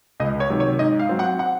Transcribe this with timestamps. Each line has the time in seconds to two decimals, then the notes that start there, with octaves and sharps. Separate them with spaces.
0.20 C#2 D#5
0.40 C#5
0.50 C3 D#3 F#3
0.60 C#5
0.79 G#2 D#5
0.99 F5
1.09 F#3 C4
1.19 F#5
1.39 F#5